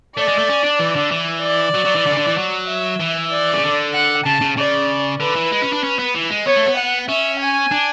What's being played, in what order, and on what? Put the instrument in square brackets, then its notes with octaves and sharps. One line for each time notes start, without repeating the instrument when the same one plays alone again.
[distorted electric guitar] A3 [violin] D5
[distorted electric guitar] G#3
A3
C#4
D4
E3
D3
E3
[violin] D5
[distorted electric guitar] F#3
F#3
E3
D3
C#3
D3
E3
F#3
[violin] E5
[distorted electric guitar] E3
[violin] D5
[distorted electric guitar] C#3
D3
[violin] F#5
[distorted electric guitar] C#3 [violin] A5
[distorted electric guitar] C#3
[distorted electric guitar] C#3 [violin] D5
[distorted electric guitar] D3 [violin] B4
[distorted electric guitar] E3
G#3
C#4
D4
C#4
B3
E3
G#3
[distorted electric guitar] B3 [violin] C#5
[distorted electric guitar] A3
B3
[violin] F#5
[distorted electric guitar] C#4 [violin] E5
[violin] G#5
[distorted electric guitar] D4